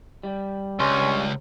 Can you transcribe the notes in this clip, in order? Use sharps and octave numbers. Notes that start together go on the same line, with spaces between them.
G3
C#2 G2 G3 C#4 C6